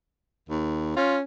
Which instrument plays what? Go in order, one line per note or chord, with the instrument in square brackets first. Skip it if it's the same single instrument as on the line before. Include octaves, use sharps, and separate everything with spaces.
[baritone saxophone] D#2
[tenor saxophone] C#4 [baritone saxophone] F4